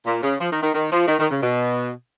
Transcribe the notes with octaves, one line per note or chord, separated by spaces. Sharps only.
A#2
C#3
F3
D#3
D#3
D#3
F3
D#3
D#3
C#3
B2